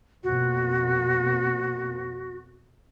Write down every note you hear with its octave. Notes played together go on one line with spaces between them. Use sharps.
F2 B2 A#3 F#4